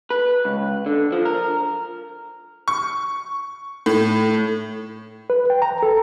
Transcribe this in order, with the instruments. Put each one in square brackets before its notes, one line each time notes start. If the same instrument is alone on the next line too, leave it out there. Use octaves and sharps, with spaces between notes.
[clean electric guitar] B4
C#2
D3
F3
A#4
[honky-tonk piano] C#6
A2
[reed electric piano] B4
G5
A#5
A4